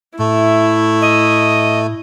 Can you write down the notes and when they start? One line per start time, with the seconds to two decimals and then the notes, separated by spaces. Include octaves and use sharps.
0.19 A2 A3 E4
1.01 D#5